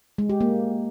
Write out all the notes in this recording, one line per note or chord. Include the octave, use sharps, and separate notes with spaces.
G#3
G4
A#3